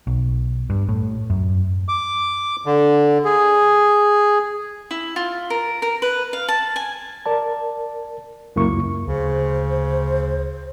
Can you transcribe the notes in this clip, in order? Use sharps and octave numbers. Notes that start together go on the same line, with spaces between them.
B1
G2
A2
F#2
D6
D3
G#4
E4
F4
A#4
A#4
B4
F5
A5
G#5
A#4 D5 A5
C#2 F#2 A#3 E4 C#6
D2 C#3 C5